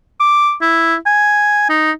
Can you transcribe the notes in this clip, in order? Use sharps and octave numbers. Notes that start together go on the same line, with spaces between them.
D6
E4
G#5
D#4